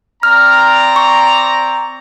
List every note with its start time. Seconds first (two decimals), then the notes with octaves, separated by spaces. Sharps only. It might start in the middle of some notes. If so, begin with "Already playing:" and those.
0.23 C4 D5 A#5 F6
0.96 C#6